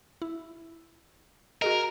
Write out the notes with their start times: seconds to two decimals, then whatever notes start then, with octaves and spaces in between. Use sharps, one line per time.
0.22 E4
1.62 F#4 G#4 A#4 D#5